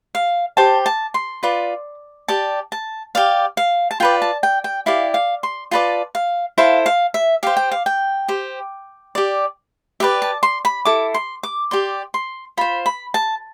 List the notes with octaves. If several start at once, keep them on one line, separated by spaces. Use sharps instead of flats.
F5
G4 C5 A5
A5
C6
F4 B4 D5
G4 D5 A5
A5
G4 D5 F5
F5
A5
F4 B4 D5 G5
A5
G5
G5
E4 G4 D5 F5
F5
C6
F4 B4 D5 A5
F5
E4 A4 C5 F5
F5
E5
G4 C5 F5
G5
F5
G5
G4 C5
G4 D5
G4 B4 D5 E5
A5
C6
B5
E4 A4 D6
C6
D6
G4 D5 C6
C6
F4 C5 B5
B5
A5